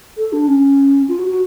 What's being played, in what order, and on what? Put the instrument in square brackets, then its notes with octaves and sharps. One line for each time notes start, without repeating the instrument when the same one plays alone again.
[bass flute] A4
D4
C#4
F4
F#4
F#4